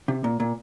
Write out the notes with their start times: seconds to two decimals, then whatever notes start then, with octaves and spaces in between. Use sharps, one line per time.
0.08 C3
0.24 A#2
0.40 A#2